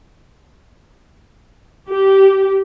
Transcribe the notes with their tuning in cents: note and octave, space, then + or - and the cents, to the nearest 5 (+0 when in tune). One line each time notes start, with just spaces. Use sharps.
G4 -15